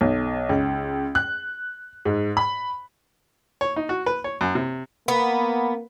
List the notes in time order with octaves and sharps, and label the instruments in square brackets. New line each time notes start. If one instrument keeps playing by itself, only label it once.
[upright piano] B1
C#2
F#6
G#2
B5
[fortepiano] C#5
D#4
F#4
B4
C#5
F#2
C3
[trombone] A#3 [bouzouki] B3